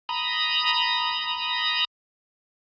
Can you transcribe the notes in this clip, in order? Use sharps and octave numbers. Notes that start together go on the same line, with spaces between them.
A#5 B5 D#6